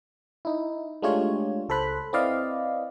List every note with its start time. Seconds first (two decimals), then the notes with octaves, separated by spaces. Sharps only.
0.45 D#4 E4
1.02 G#3 A3 D4 F4 G4 C#5
1.69 C#2 A4 C5 B5 F#6
2.13 C4 E4 B4 D5 D#5 F5